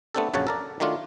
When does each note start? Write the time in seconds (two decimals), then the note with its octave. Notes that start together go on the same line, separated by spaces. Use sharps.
0.15 A3 B3 C4 D4 G4 A4
0.34 A#1 F#2 C#3 C#5 F#5 A5
0.47 A4 A#4 D5
0.80 D#3 F#3 A3 D4 F4